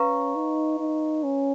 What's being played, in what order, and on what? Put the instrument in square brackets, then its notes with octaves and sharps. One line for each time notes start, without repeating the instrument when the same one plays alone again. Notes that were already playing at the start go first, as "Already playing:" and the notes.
Already playing: [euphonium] C#4 [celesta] B4 F5 A#5 C#6
[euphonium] D#4
D#4
C#4